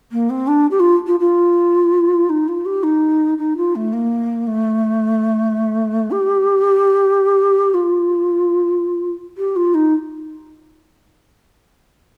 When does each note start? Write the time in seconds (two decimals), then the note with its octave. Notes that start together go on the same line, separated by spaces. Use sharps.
0.12 A#3
0.30 C4
0.47 D4
0.71 G4
0.80 F4
1.06 F4
1.20 F4
2.29 D#4
2.48 F4
2.66 G4
2.83 D#4
3.38 D#4
3.57 F4
3.75 A3
3.93 A#3
4.47 A3
6.11 G4
7.74 F4
9.37 G4
9.56 F4
9.74 D#4